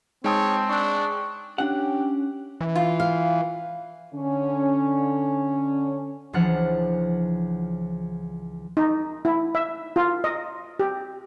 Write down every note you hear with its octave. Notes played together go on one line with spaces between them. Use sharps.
G#3 C4 D#4 C#5 G5 A5 D#6
D4 C#6 F#6
C#4 D4 G4 F#5
E3
F4
F5
D3 C#4
C#2 E3 F3 D4 F#5 F6
D#4
E4
E5
F4
D#5
G4